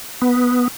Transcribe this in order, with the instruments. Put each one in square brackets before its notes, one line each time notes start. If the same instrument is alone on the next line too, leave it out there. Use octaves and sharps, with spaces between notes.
[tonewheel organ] B3